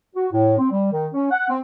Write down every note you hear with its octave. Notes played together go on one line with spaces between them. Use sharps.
F#4
A2
C4
G3
D#3
C#4
F#5
C4